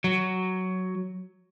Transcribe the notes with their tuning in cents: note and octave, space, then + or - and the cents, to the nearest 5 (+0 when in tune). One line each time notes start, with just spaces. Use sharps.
F#3 +5